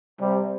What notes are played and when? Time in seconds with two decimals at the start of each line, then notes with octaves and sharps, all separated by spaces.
0.21 C3 G3